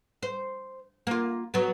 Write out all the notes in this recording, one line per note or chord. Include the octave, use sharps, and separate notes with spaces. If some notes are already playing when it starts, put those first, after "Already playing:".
C5
A#3 F4
F#3 B3